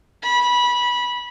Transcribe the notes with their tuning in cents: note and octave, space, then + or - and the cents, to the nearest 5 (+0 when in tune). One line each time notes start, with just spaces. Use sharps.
B5 -20